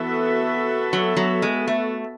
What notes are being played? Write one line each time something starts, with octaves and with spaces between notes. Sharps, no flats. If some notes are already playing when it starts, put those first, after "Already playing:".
Already playing: E3 B3 F#4 A4 E5
F#3
F#3
G#3
A3